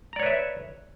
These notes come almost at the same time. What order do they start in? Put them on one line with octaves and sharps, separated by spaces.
A#5 D5 C#5 B4 E5